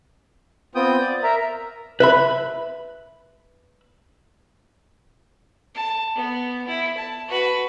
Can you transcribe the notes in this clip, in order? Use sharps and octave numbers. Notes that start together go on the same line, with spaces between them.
B3 C4 F4 G5 D#6 G6
D5
A#4 E5 A#5
B4 E5 B5
A5
B3
E4
A5
F#4 B4